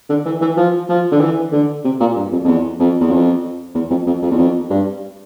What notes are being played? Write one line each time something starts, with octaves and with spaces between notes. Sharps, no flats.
D3
E3
E3
F3
F3
D3
E3
D3
C3
A#2
G2
F2
F2
E2
F2
E2
F2
E2
F2
F2
F2
E2
F2
G2